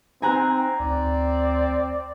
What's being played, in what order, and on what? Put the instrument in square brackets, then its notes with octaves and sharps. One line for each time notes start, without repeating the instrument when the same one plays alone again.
[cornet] C4 [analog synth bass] D#4 [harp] G#5 A#5 F#6
[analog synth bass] D2 [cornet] C4 [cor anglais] D5